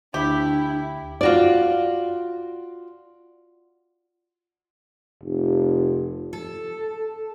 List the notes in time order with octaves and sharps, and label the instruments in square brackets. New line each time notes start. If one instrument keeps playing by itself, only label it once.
[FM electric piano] D2 B5 [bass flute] D4 [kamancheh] E4 [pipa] G4
[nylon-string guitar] F4 F#4 D5
[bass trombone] F1
[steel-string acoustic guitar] A4